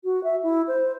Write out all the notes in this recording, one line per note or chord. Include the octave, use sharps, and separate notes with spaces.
F#4
E5
E4
C5